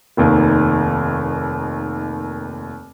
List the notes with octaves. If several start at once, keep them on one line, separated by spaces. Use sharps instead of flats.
F1 D#2 D#3